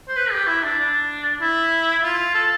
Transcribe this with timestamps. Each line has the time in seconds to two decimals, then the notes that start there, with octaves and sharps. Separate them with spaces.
0.09 C5
0.17 B4
0.32 G4
0.47 E4
0.64 D4
0.79 D4
1.42 E4
2.03 F4
2.35 A4